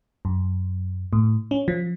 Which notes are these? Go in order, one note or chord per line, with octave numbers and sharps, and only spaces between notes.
F#2
A2
C#4
F3